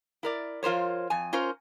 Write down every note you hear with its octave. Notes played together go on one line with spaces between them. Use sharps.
E4 A#4 D5
F3 F4 A#4 C5 C#5
F2 G#5
C#4 F4 A#4 C5